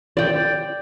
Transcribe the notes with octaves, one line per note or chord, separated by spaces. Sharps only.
D5 G5